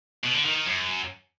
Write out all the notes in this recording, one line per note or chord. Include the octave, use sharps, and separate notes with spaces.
B2
D3
D#3
D#3
F#2